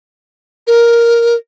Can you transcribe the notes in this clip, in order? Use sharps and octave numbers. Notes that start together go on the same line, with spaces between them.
A#4